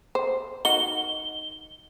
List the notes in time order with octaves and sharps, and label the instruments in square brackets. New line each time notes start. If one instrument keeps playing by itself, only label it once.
[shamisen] C5
[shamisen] D#3 F#4 [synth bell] G7